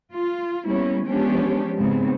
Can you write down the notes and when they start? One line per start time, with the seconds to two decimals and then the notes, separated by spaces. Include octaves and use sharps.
0.13 F4
0.65 G3 A#3 B3 C#4 E4
1.05 F3 G#3 B3 C#4 D4 G4
1.77 G#2 C#3 B3 C4